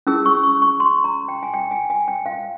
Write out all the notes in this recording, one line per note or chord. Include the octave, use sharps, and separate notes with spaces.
C#4 E4 G#4 E6
C#6
C#6
C#6
C6
A#5
G5
G#5
G5
G#5
G#5
G5
F5